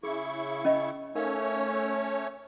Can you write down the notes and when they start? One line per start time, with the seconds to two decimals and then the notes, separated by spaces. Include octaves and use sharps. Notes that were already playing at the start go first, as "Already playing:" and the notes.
0.03 C#3 E4 G#4 C#6
0.65 C#4 D#5 B5
1.15 A3 C#4 D#4 A#4 C#5 F5